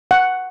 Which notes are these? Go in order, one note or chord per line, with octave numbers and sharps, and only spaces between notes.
F#5